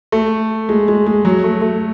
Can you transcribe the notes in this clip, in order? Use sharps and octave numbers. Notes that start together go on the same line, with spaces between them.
A3
G#3
G#3
G#3
F#3
A3
A3